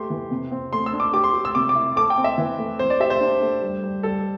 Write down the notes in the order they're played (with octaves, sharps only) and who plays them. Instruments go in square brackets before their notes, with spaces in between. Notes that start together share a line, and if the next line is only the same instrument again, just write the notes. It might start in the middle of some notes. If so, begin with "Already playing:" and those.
Already playing: [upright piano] A3 G4 [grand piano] C6
[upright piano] E3
C3
C4
[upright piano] A3 [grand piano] C6
[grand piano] E6
[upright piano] D4
[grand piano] D6
[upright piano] G4 [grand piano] D6
[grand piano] C6
[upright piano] G4
[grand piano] E6
[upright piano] C3 [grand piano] D6
[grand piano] D6
[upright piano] E4
[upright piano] A4 [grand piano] D6
[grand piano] G5
[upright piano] C4
[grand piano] E5
[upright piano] E3
A3
[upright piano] C4 [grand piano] C5
[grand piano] D5
[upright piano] G4 [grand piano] E5
[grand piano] C5
[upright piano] D4
A3
G3
G3
[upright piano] G3 [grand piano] A4